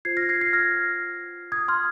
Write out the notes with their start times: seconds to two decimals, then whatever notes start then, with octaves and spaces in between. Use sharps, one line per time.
0.05 F4 C5 G#6 C7
0.17 F6 A#6
0.29 G#6 C7
0.41 G#6 C7
0.53 F6 A#6
1.52 D#6 G#6
1.68 C6 F6